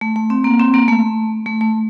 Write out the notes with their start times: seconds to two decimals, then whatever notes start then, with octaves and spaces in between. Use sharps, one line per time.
0.01 A3
0.16 A3
0.30 C4
0.44 A#3
0.60 C4
0.74 A#3
0.88 A3
1.46 A3
1.61 A3